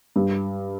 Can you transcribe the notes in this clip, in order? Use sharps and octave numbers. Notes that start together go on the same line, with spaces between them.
G2